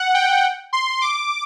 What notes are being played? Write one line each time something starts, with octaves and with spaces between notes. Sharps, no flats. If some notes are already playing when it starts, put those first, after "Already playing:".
Already playing: F#5
G5
C6
D6